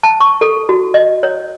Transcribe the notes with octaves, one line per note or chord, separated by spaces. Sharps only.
A5
C#6
A4
F#4
D#5
C#5